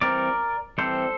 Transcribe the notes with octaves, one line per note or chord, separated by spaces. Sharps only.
E3 G3 C4 A#4 D5
E3 G3 C4 A4 C5